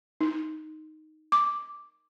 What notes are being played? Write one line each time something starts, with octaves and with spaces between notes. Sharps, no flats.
D#4
D6